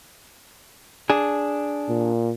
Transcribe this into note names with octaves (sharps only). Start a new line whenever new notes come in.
D4 G#4
A#2